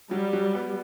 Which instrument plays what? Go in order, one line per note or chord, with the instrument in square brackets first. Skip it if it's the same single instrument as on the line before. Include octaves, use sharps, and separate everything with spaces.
[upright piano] F#3 [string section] G3
[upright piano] F#3
B3